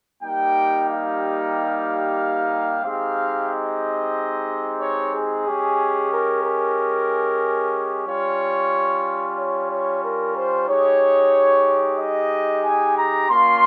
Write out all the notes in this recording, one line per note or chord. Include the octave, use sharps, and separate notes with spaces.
G3 A#3 D#4 G4 G5
F5
G#3 C4 D#4 G4 F5
D#5
C#5
G#4
G#3 C#4 G4
A#4
A#4
G3 C#4 F4 C#5
C#5
C#5
A#4
C5
G#3 D#4 G4 C#5
D#5
G#5
A#5
A#3 C#4 F4 C6